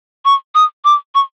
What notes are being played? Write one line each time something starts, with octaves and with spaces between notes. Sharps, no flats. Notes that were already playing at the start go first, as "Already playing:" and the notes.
C#6
D#6
D6
C#6